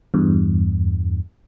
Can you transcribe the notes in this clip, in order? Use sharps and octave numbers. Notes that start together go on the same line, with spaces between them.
E2 G2